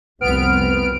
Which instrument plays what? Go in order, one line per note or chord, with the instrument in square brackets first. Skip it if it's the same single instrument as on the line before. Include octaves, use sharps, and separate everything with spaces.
[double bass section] F1 C2 C4 [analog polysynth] B3 F6 D7